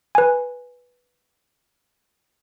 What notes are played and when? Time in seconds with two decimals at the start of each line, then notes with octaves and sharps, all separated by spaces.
0.15 B4 G#5